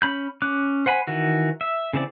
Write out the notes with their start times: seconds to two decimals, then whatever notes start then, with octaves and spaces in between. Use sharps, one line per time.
0.02 C#4 B5 G6
0.42 C#4 D6 F#6
0.86 C5 F#5 G#5 B5
1.07 D#3 E3 F#4
1.61 E5
1.93 C#3 E3 C4 D5